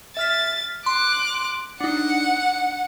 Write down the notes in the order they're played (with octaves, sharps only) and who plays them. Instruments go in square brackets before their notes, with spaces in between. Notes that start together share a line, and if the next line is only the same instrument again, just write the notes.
[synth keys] E5 F6 B6 [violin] A6
[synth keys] C6 [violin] D6 F#6
[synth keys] D4 D#4 [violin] F#5